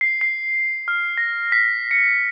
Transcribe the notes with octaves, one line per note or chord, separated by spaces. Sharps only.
C7
C7
F6
A#6
B6
C#7